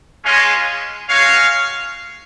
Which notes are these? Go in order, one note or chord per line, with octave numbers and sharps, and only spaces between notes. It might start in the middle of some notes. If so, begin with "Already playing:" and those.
G#3 C#4 F4
G#3 C#4 F#4 C#5 F5